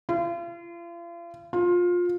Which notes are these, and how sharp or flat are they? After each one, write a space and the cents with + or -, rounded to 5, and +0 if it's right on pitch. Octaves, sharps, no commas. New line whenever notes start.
F4 -40
F4 +20